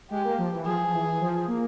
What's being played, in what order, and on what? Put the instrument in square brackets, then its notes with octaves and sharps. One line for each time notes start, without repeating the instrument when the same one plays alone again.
[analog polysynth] G#3 [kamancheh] G4
[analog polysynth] A#3
F3
E3
[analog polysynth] F3 [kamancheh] G#4
[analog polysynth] F3
E3
F3
A#3